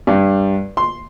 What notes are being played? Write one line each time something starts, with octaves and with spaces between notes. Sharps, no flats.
G2
C6